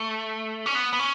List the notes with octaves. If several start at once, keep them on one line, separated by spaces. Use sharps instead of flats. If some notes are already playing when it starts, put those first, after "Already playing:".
Already playing: A3
C#4
B3
B3
C#4